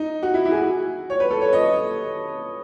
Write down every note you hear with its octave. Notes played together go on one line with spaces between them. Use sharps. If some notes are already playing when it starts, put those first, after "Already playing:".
Already playing: D#4
F#4
E4
E4
G#4
F#4
C#5
B4
A4
C#5
D#5